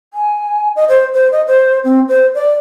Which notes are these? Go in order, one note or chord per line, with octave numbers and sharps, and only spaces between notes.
G#5
D#5
C5
C5
D#5
C5
C4
C5
D5